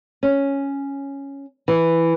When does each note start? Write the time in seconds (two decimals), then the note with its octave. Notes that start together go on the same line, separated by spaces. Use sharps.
0.23 C#4
1.68 E3